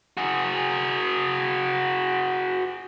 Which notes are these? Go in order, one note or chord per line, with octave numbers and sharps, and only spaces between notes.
F#4 G#4